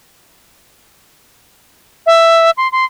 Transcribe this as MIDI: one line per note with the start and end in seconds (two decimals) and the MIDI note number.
2.06 2.50 76
2.57 2.70 84
2.72 2.85 84